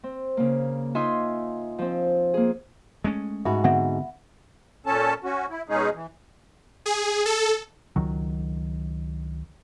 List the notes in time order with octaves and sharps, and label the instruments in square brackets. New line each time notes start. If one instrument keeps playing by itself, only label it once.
[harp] C4
C#3 A#3
D#4 F4 D#5 E5 G#5 C6
F3 C4
A#3 G#4
[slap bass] G#3 A3 C#4
[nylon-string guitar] G#2 F#4 [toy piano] E5 B5
[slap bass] D3 B3 C4 [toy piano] E5 F#5
[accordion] A#2 C#4 A4 A5
C#4 F#4
E4
B2 G#3 C#4 D#4 G#4
E3
[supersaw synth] G#4
A4
[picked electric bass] C#2 D#3 F#3